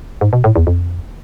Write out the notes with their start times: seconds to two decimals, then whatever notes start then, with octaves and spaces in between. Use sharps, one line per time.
0.21 G#2
0.33 B2
0.44 A2
0.56 E2
0.67 F2